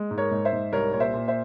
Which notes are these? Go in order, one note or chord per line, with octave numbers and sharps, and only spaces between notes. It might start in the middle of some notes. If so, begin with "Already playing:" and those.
Already playing: G#3
G#2
A#4 C#5
G#2
C5 E5
G#2
C2 A#4 C#5
A#2 C#5
C5 E5
A#2
C5 E5